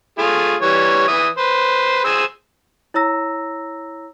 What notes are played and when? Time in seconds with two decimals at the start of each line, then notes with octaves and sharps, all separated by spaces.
0.18 A3 F4 G#4
0.61 E3 G3 C#5
1.08 E3 E5 D#6
1.38 B4 C5
2.04 G#4 C5 E6
2.94 E4 C#5 A#5 E6 A#6